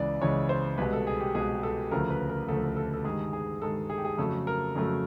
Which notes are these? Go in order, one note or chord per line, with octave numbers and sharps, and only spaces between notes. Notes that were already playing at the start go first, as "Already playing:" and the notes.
Already playing: C#2 C#3 E3 G#3 D5
C#2 C#3 E3 G#3 C#5
C5
C2 B2 G#3 B4
A4
G#4
G4
C2 B2 G#3 G#4
A4
D2 C#3 F3 A3 A#4
B4
A#4
D2 C#3 F3 A3 A4
A4
A4
G2 D#3 G#3 G#4
G#4
G2 D#3 G#3 A4
G#4
G4
G#4
F2 C#3 F#3 A3 A4
A#4
F2 C#3 F#3 A3